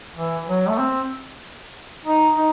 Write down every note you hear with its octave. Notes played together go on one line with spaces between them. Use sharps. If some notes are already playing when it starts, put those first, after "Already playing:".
E3
F#3
A3
C4
D#4
D#4